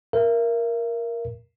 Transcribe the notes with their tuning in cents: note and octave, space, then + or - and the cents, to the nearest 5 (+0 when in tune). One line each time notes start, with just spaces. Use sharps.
A#4 +5 E5 +35